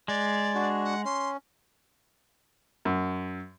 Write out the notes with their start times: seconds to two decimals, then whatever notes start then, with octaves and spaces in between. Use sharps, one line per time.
0.08 G#3 D5
0.55 D4 F#4
0.85 F#5
1.05 C#4 C6
2.85 F#2